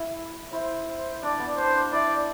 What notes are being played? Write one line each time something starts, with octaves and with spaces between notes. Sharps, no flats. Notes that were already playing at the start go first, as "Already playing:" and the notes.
Already playing: E4
E4 C5
C5
D4 D5
B3
D4 C5
D4
E4 D5